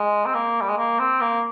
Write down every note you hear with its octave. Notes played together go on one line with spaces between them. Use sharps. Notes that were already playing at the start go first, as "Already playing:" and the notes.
Already playing: G#3
C4
A#3
G3
G#3
A#3
C4
A#3